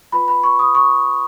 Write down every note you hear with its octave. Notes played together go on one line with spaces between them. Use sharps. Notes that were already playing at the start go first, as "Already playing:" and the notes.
F4 B4 B5
B5
C#6
D#6
C#6